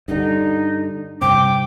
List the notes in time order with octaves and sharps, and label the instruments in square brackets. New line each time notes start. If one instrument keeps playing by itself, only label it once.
[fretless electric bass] G2 D3 [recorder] D#4
[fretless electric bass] G2 C3 C4 [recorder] G5 [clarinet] D6